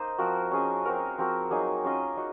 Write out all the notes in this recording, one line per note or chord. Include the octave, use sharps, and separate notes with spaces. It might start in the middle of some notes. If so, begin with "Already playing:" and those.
Already playing: A#3 D#4 C5 D#5
F3 C4 F#4 A#4
C#4 G#4 D#5
C4 F#4 A#4
F3 C4 F#4 A#4
F#3 A#3 D#4 G#4
C#4 F4 A#4 D#5
D#4 F#4